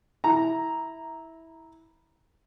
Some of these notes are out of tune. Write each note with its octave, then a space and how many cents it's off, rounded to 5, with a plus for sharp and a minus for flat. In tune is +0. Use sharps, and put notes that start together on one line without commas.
E4 -15 A#5 +0